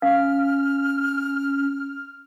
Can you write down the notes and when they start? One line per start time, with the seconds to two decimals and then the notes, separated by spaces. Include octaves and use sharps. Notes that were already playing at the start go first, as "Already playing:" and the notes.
0.02 C#4 F5 F6